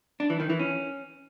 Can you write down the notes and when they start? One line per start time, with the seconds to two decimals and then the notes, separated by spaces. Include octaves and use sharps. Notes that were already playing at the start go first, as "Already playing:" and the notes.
0.20 D4
0.30 E3
0.40 D#3
0.50 E3
0.59 C#4